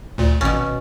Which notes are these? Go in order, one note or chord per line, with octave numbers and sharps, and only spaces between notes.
D2 A#2
G#1 B2 C#4